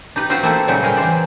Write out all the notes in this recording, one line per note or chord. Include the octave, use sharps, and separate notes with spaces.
D#4 G4 B4
C4 D#4 F4 F#4 B4 C5
A#3 C4 D#4 E4 A4 B4
A#2 C#3 F#3 G3 C4 D#4
G#4 A#4 B4 G5
E3 C5 D5